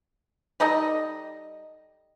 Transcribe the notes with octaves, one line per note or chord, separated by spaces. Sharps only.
G3 D#4 A4 D#5